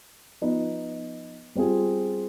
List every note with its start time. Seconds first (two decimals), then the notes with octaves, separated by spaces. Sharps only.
0.41 F3 B3 D#4
1.55 G3 C4 F4 G#4